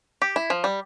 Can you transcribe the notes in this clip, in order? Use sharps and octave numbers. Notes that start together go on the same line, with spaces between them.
G4
E4
F3
G3